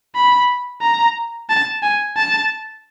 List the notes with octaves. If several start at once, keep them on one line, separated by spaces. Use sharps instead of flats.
B5
A#5
A5
G#5
A5